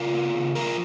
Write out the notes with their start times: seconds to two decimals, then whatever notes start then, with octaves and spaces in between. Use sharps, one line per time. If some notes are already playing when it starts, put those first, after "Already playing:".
Already playing: C#3 F4 A#4
0.14 A#3
0.35 C#3
0.55 F3 F4 A#4